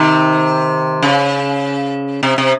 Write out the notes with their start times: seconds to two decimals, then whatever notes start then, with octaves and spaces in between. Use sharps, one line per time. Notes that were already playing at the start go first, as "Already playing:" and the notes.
Already playing: C3 D#3
1.03 C#3
2.23 C3
2.38 C3